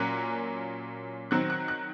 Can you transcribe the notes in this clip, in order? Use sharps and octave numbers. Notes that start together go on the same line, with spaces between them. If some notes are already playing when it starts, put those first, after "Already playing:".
Already playing: A#2 F#3 A#3 C#4 F#6
D#3 F#3 C4 F#6
F#6
F#6